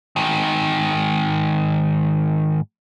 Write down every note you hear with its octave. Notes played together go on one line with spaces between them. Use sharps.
G#2 D#3